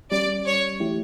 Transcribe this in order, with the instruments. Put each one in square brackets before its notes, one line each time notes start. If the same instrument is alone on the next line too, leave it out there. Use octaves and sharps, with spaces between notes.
[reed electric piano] G3 C#4 G4 [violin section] D5
[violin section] C#5
[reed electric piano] E3 A3 E4 G4